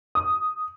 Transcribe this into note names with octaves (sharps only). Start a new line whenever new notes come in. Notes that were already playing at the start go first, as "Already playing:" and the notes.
D#6